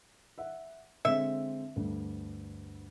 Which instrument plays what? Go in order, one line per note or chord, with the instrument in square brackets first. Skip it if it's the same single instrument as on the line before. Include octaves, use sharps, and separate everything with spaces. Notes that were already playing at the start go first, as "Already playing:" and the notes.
[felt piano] E5 F#5
[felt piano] D3 G#3 C4 [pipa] E5
[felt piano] D2 G2